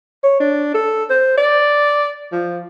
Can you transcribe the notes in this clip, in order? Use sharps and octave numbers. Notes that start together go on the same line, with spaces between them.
C#5
D4
A4
C5
D5
F3